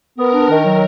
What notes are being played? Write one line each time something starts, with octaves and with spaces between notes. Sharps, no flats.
B3 A#4
D4
D#3
F#3